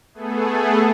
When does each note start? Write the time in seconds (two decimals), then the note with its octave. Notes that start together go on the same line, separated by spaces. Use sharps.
0.14 A3 B3 G#4 A4